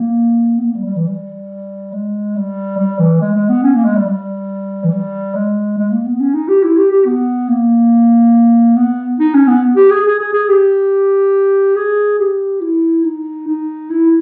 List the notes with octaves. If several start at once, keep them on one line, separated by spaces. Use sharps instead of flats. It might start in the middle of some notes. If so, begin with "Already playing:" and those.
Already playing: A#3
B3
A#3
G3
G3
E3
G3
G#3
G3
G3
E3
G#3
G#3
B3
C#4
A#3
G#3
G3
G3
E3
G3
G#3
G#3
A#3
B3
C#4
D#4
G4
E4
G4
G4
B3
A#3
B3
D#4
C#4
B3
G4
G#4
G#4
G#4
G#4
G4
G#4
G4
E4
D#4
D#4
E4